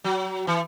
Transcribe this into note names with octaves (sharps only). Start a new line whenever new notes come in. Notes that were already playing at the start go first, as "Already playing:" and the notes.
F#3
E3